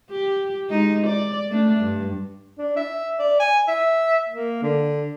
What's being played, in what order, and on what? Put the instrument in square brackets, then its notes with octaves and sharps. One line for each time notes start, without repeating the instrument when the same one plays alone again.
[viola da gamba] G4
G#3 D#4
D5
A3 D4
G2
[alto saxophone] D4
E5
D5
G#5
E5
A#3
D3